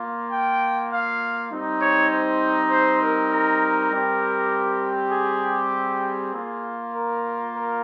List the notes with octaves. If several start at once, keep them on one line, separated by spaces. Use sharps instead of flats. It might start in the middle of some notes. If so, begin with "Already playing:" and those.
Already playing: A#3 F4
G5
F5
G3 C4 D#4
C#5
C5
C5
A#4
A#4
G3 C4 G4
G#4
G#4
A#3 F4
A#4
A#4